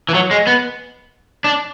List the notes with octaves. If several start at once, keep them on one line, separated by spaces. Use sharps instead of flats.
E3
F#3
G#3
B3
D4